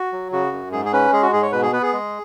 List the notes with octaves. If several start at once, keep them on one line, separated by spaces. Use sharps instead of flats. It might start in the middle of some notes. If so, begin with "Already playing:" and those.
Already playing: F#4
F#3
C#3 F#4
F#2
G#2 G#4
G#4
C#4 B4
G#3 G#4
F#4
G#2 G#4
C#5
B2 B4
G#4
B3 B4
G#4
G#3